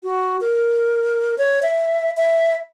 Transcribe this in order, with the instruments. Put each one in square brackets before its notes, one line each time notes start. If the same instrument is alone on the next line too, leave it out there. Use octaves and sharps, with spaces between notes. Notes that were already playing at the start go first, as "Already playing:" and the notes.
[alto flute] F#4
A#4
C#5
E5
E5